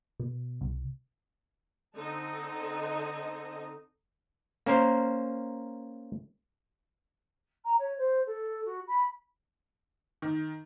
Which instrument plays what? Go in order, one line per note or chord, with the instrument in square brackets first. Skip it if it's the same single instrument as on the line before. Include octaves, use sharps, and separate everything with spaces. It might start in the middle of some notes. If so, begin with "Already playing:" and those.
[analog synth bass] B2
C2
[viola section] D3 C4 D#4 A4 D#5
[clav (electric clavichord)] A#3 C#4 A#4 C5
[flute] A#5
C#5
C5
A4
F#4
B5
[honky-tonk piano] D#3